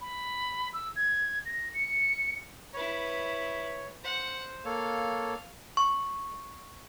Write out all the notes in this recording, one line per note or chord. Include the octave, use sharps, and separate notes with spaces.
B5
E6
G#6
A#6
C#7
E4 B4 C#5
C5 F#5
A#3 A4 C#5 F5
C#6